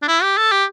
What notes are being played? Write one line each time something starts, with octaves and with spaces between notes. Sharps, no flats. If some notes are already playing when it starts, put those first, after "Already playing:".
D4
E4
G4
A4
G4